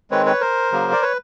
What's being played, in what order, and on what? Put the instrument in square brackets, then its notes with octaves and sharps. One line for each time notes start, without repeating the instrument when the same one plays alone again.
[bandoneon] D#3 G#3 C4 B4 C#5
B4 C#5
A#4 C5
C#3 F#3 A#3
D5
B4 C#5